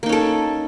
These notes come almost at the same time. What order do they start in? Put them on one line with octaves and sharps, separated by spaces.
A#3 D#4 C#4 A4